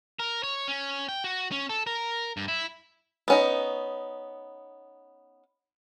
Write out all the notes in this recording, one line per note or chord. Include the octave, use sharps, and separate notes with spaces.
A#4
C#5
C#4
G5
F#4
C#4
A4
A#4
G2
E4
B3 C#4 D#4